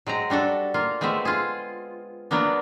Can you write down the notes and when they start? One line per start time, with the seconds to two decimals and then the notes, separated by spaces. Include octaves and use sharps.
0.07 F#3 G#3 C4 A#5
0.30 G3 D4 F#4 A4
0.74 A#3 F4
1.01 G#3 A3 B3 C4 E5
1.25 F4 G#4
2.31 F#3 A#3 B3 D4